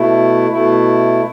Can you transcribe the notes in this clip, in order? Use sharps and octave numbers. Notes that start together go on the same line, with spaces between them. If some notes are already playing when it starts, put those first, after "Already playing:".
Already playing: B2 A3 E4
B2 A3 E4